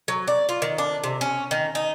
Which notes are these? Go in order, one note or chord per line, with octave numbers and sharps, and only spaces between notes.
F#3
D5
F4
D#3
D4
C3
C#4
D#3
D#4